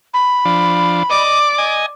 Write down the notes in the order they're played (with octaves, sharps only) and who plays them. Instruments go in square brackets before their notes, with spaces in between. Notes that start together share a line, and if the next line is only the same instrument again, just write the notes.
[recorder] B5
[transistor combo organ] F3 D4
[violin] D5 D6 [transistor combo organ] D#5
[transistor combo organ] D#5 G#5